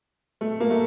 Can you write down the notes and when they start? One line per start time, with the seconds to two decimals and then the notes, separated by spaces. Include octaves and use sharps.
0.41 A3
0.60 A#3
0.70 A3